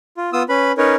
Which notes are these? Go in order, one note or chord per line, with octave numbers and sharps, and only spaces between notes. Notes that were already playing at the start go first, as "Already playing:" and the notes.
F4
B3 F4 D#6 E6
C#4 B4 B5
C#4 D#4 A#4 B4 C#5